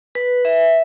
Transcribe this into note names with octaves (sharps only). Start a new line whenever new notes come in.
B4
E5